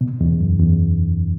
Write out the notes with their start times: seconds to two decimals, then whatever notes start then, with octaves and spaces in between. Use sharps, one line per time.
0.01 B2
0.21 E2
0.41 F#2
0.60 E2